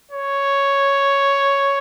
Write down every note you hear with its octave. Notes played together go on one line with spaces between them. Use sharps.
C#5